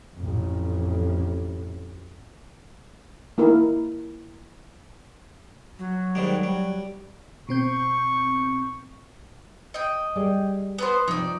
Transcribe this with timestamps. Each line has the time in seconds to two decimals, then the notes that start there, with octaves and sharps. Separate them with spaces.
0.16 A1 F2
3.38 A#3 D#4 E4 A#4
5.79 F#3
6.15 G#2 D#3 G3
6.43 G3
7.49 B2 C4 C#6 G6
9.74 D#5 G5
10.16 G3 G#4 D5
10.78 B3 B4 C5
11.08 C3 F3 D#4 D5